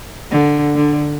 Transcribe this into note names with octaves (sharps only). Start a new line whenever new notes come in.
D3
D3